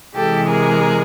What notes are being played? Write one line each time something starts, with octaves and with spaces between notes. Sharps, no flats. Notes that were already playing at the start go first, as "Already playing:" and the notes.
C3 E3 G#3 G4 A4
G#4 A#4